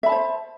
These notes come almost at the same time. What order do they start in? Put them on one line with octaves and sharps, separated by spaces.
E5 B5 A5 C5